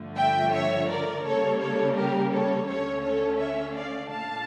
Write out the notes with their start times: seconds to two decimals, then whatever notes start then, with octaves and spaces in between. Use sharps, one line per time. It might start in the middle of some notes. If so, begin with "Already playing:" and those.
Already playing: G2 D3 F3 A3
0.17 E5 G5
0.53 C#5 E5
0.89 A#4 D5
1.24 C#3 G3 A#3 A4 C#5
1.60 A4 C#5
1.96 G4 A#4
2.32 A4 C#5
2.67 D2 D3 A3 C#4 A4 C#5
3.04 A4 C#5
3.39 C#5 E5
3.75 D5 F5
4.11 A#2 A3 D4 F5 A5